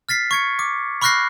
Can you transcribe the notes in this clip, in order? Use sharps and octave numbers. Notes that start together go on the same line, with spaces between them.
F6 A6 B6 C7
C#6 G#6 C#7
D6
B5 C#6 F6 F#6 A#6 C7